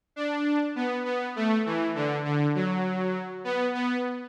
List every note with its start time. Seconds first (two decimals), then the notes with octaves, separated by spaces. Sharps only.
0.16 D4
0.76 B3
1.05 B3
1.36 A3
1.66 E3
1.95 D3
2.25 D3
2.55 F#3
3.44 B3
3.75 B3